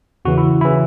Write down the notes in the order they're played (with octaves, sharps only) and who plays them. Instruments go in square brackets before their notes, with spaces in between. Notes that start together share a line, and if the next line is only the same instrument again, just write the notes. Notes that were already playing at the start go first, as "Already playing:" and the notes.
[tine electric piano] E2 C#3 E3 F#4
E4
C#3 E3 E4